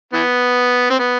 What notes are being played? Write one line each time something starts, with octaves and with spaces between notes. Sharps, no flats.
E3 B3
C4
B3